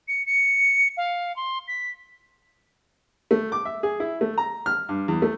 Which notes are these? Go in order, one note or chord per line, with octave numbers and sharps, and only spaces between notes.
C#7
C#7
F5
C6
B6
A3
D6
E5
G#4
E4
A3
A#5
F6
G2
E2
A3